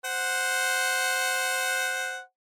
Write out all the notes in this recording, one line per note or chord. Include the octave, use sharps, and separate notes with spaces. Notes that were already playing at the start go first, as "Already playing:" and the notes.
C5 F#5